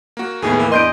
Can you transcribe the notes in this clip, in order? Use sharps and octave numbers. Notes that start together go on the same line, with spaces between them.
A#3 F#4
D#2 A2 B3 G#4
E3 A#3
E2 D4 D#5 C6 G6 D7